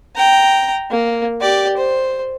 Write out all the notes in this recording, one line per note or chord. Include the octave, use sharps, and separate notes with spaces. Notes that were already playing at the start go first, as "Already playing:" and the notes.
G5 A#5
A#3
G4 D5
C5